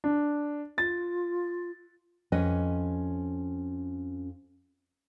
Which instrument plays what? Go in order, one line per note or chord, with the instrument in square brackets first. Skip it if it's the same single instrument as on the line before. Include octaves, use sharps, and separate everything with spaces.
[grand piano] D4
[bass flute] F4 [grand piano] A6
[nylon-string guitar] F2 C#4 B4 D#5